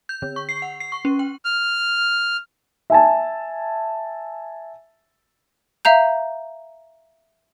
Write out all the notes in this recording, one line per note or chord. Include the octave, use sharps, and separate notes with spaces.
G6
D3
C#6
C7
F#5
C7
C#6
C#4
G5
F6
E5 G#5 A5
E5 F5 A#5 G6